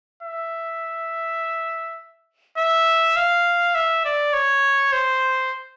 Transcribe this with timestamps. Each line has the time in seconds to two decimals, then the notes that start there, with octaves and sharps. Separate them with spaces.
0.23 E5
2.58 E5
3.17 F5
3.75 E5
4.05 D5
4.34 C#5
4.93 C5